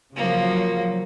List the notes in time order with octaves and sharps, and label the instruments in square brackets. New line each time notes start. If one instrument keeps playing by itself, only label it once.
[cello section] C#3 F3 F#3 [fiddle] A#3